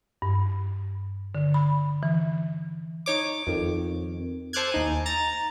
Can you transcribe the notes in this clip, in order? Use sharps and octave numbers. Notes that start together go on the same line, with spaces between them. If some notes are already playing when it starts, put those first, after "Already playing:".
G2
D3
B5
E3
D#4 C#5 D6
F2 D#3
A4 C5 D6 F6 F#6 G#6
D#2 D#4 G#5
A#5 A6